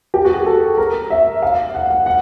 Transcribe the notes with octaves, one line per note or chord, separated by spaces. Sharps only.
G4
F#4
G#4
A4
A#4
E5
F5
F#5
F#5
F#5